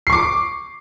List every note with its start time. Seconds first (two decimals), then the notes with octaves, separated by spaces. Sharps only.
0.07 C7
0.10 C#6
0.12 D6